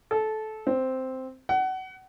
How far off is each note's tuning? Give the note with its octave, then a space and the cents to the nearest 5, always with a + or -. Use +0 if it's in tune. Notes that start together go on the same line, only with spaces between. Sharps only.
A4 -20
C4 -5
F#5 +25